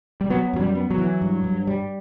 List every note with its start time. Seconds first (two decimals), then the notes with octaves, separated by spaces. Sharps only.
0.21 G3
0.30 F#3 B3
0.53 F#2 F#3
0.61 G3
0.75 B3
0.91 F#3
0.98 E3
1.22 G2
1.44 G2
1.67 G3